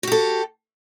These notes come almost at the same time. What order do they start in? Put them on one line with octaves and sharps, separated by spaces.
F#4 G4 A4